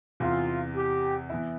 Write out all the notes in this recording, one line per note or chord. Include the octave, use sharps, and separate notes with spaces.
E2 C3 E3 F4
G4
E3 B3 E4